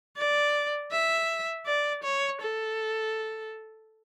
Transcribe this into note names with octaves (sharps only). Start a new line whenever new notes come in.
D5
E5
D5
C#5
A4